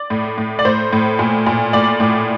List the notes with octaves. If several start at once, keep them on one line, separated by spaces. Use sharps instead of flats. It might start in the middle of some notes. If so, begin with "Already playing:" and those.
Already playing: D5
A2
A2
D5
A2 C5
A2
A#2
A#2
A2 D5
A2